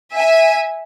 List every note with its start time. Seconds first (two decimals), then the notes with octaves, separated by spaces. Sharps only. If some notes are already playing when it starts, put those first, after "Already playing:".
0.12 E5 G#5